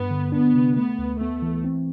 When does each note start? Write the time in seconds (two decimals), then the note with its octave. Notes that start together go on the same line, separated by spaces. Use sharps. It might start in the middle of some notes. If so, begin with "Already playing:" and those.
Already playing: G2 B3
0.10 D3
0.32 B3 D4
0.54 C3
0.77 A3 B3
0.98 D2
1.20 A3 B3
1.42 E3
1.64 C4